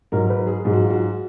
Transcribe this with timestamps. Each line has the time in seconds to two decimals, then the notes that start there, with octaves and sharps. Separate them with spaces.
0.12 G#2 F#3 A#4
0.30 B4
0.47 G#4
0.64 G#2 F#3 G#4
0.73 F#4
0.82 F4
0.90 F#4